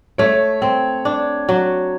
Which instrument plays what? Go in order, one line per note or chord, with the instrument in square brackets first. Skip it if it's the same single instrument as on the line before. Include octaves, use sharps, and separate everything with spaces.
[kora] A3 [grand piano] C#5
[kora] C4
D4
F#3